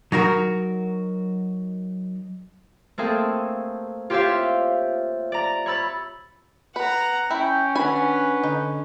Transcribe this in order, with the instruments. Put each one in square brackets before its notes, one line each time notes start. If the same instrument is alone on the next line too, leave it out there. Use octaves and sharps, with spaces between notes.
[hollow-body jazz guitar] F#3 D#4 F#4 A#4
[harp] A3 A#3 C4 G#4 A4
F4 G4 C5 C#5 E5 F5
D5 A#5
C#5 B5 E6 A6
[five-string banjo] B4 [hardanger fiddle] F#5 A#5
[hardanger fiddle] C#4 [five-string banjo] E4 [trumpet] G5
[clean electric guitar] D4 F#5 [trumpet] B4 [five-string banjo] G#5 B5
[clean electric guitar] D3 [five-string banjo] D#4